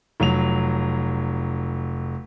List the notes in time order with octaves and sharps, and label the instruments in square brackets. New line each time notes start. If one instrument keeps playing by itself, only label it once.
[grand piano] F1 F#3 F7